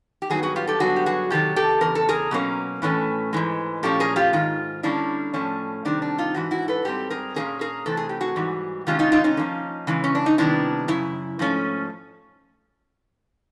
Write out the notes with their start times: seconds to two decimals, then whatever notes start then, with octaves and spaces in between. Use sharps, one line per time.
0.22 G4
0.30 G2 D#3 F#3 B3 F#4 G#4
0.43 F#4 G#4
0.56 F4 G4
0.68 G4 A4
0.80 G2 D3 F#3 B3 F#4 G#4
0.96 G4
1.06 F#4 G#4
1.30 C3 D#3 F#3 G4 A4
1.56 G4 A4
1.81 E2 C#3 A#4
1.95 A4
2.09 G#4 A#4
2.31 B2 F#3 A#3 C#4
2.82 A2 E3 A3 C#4
3.33 G#2 E3 G#3
3.83 A#2 F3 A3 C#4 G4 A4
4.00 G#4 A#4
4.16 F4 G4
4.33 G#2 D#3 F4
4.83 D3 G3 A#3 C#4 D4 E4
5.34 A2 F3 A3 C#4
5.85 C3 D#3 G3 C4 D4
6.02 D4
6.18 D#4 F4
6.35 G#2 E3 F#4
6.51 E4 F#4
6.68 A4 B4
6.85 G#2 E3 G3 C4 G4 A4
7.10 G#4 A#4
7.36 A#2 F#3 A#3 C#4 G#4 A#4
7.61 G#4 A#4
7.86 C3 E3 A3 C4 A4
7.97 G#4
8.09 G4
8.21 F#4 G#4
8.36 G#2 E3 G3
8.87 C3 D#3 G#3 C#4 F4 G4
8.99 D#4 F4
9.12 D#4 F4
9.24 C#4 D#4
9.37 D3 F3 A#3
9.87 C#3 E3 G#3
10.04 C#4
10.15 D4
10.26 D#4
10.38 C3 D#3 G3 B3 D4 E4
10.88 F#2 C#3 E4
11.39 G#2 F3 A3 C#4